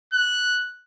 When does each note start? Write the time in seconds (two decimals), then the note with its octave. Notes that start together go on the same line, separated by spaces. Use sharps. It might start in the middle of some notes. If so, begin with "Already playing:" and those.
0.13 F#6